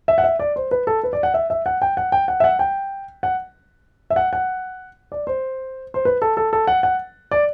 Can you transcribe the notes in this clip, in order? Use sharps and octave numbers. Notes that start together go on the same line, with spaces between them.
E5
F#5
E5
D5
C5
B4
A4
B4
D5
F#5
E5
E5
F#5
G5
F#5
G5
F#5
E5
F#5
G5
F#5
E5
F#5
F#5
D5
C5
C5
B4
A4
A4
A4
F#5
F#5
D5